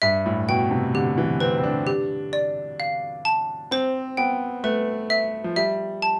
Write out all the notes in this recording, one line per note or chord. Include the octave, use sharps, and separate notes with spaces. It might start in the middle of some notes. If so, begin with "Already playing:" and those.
G2 E5
A2
B2 G5
C3
D3 G4
E3
C4 B4
C4
D4
G4
D5
F5
A5
C4 C5
B3 G5
A3 B4
E5
F3
G3 E5
A5